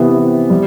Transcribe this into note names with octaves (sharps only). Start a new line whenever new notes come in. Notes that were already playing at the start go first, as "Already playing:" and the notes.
Already playing: C3 E3 B3 E4 G4
G3